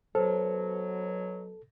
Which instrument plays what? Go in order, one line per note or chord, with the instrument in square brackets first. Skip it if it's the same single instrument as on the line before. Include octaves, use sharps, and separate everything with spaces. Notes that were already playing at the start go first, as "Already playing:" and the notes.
[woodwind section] B2 F#3 [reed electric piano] A4 [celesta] C5